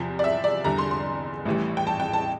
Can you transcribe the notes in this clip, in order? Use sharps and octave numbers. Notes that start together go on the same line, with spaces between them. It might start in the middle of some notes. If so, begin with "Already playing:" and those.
Already playing: E2 C3 F3
D5
E5
D5
E2 D3 G3 A#5
C6
C6
A1 A2 E3 G3
G5
A5
G5
A5